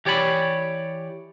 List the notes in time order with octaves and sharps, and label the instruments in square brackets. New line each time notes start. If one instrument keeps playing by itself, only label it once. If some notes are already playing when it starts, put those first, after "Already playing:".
[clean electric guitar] E3 G4 C#5 D5 B5